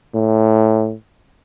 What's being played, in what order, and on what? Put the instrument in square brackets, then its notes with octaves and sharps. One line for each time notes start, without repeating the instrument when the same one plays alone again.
[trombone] A2